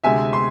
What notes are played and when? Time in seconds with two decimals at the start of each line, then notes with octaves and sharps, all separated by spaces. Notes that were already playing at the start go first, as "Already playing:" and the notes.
0.04 D2 C3 G#3 E5 G#5
0.33 C6